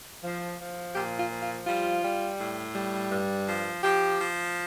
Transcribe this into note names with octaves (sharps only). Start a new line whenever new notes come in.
F3
F3
A#2 G4
F4
F3
F4
G3 F4
G3
A2
G3
G2
F3
F3 G4
F3